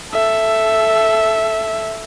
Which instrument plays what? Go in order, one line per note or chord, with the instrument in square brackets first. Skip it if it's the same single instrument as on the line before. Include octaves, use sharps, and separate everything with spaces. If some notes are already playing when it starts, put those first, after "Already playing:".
[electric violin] A4 E5